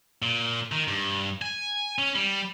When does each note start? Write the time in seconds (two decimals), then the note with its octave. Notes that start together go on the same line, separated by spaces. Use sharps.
0.22 A#2
0.72 D#3
0.88 G2
1.42 G#5
1.98 C#4
2.15 G3